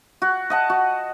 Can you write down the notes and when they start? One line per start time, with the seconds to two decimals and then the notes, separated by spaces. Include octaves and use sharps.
0.22 F#4
0.50 D#5 F#5 A5
0.70 F#4